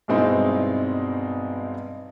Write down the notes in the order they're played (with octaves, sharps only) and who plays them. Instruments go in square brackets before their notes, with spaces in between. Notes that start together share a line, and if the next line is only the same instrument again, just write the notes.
[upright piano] G2 B2 G#3 C4 D#4 E4